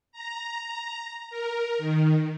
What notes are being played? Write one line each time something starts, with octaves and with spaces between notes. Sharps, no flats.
A#5
A#4
D#3